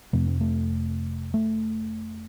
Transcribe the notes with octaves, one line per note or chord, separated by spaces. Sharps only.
F1 F2 C3 A3
C4
A3
A3